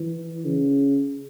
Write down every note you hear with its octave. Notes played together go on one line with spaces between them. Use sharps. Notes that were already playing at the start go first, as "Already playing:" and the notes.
Already playing: E3
C#3